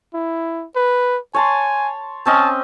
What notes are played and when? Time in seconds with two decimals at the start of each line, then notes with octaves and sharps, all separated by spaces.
0.14 E4
0.76 B4
1.34 C#5 G#5 A5 C6
2.26 C4 C#4 D#5 A5